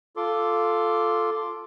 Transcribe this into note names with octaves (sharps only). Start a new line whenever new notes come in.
F4 A4 C6 D6